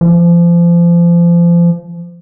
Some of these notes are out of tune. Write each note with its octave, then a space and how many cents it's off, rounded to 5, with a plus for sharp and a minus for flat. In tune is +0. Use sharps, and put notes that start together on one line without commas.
F3 -30